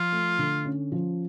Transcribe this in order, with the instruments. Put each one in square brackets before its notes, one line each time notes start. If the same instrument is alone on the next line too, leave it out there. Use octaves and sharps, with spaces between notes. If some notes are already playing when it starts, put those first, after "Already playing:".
Already playing: [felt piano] F3 [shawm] F4
[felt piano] A3
D3
C#4
F3